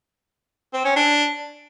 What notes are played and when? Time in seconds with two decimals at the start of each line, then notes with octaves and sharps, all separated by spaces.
0.73 C4
0.85 C#4
0.96 D4